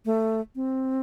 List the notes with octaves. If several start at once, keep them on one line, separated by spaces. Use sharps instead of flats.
A3
C4